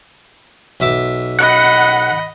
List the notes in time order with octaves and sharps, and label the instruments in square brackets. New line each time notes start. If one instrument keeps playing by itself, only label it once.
[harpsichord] B1 E5 D6
[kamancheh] D#5 B5 [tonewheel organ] F#5